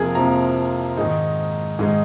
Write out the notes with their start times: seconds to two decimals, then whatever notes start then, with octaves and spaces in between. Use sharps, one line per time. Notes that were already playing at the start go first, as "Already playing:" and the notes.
Already playing: F2 C3 F3 A#3 G#4 A#4
0.15 F2 C3 F3 A#3 A#5
0.97 G#2 D#3 G#3 D#4
1.79 G#2 D#3 G#3 D#4